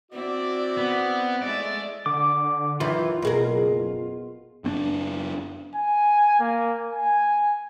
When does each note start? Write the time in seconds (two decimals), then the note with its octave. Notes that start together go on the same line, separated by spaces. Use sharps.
0.12 C4 E4 F#4 D5
0.77 B3
1.42 G#3 A3 E4 D5
2.06 D3 D6
2.80 F#2 D#3 E3 F4
3.22 F#1 B2 G#4 A#4
4.64 F#1 C4 D4
5.75 G#5
6.39 A#3
6.93 G#5